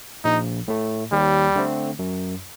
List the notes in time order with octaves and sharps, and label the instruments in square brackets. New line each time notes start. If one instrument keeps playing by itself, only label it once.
[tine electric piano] A#1 [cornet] D#4
[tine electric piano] A2 A3
[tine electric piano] D#2 [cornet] G3
[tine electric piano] D3 A3 C4
F#2